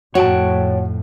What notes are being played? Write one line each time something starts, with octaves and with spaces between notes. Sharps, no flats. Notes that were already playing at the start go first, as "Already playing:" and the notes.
F2 A2 F#4 C#5 G5 A5